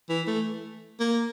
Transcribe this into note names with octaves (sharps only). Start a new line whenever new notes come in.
E3
A3
A#3